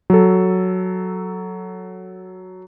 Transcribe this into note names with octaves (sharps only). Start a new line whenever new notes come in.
F#3 A4